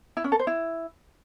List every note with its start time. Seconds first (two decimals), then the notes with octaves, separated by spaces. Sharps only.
0.17 E4
0.24 C#4
0.32 A4
0.39 C5
0.47 E4